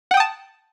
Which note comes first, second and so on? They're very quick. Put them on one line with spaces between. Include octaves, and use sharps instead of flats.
F#5 G5 D#6 A5